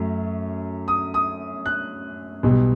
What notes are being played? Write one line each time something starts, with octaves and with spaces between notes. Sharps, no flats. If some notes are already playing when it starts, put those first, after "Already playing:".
Already playing: F#2 F#3 A3
D#6
D#6
F#6
B1 B2 G3